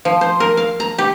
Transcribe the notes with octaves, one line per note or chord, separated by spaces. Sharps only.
F3
C5
A#4
F5
A#5
G4